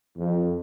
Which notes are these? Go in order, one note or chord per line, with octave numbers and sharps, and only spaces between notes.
F2